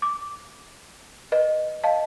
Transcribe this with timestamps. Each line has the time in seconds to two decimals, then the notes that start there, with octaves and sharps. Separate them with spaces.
0.02 D6
1.32 B4 D#5
1.84 D#5 F5 A5